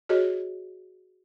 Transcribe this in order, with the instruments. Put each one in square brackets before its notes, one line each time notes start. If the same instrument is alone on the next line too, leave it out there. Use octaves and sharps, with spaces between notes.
[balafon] F#4 G#4 C#5 D#5